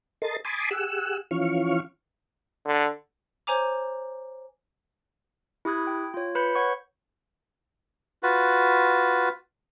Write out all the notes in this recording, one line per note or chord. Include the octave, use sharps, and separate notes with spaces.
A4 A#4 D#5 C6 A6
G#5 A5 B5 C6 D6 D#6
G4 G#4 F#5 E6
E3 F3 C#4 F5 C#6
D3
C5 C#5 G#5 A#5 D6
E4 G4 B5 D#6 F#6 G#6
G5
F4 C#5
B4 B5 G6 C#7
C#5 F#5 C#6
F4 F#4 B4